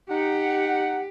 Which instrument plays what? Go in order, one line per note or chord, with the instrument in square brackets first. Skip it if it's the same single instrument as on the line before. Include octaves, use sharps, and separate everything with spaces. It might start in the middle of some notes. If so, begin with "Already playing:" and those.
[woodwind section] D#4 F#5 [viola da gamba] G4